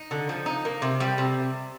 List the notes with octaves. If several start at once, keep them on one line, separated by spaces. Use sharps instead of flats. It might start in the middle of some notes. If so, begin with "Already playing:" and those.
Already playing: D#4
D3
F3
D#4
A#3
C3
G3
C3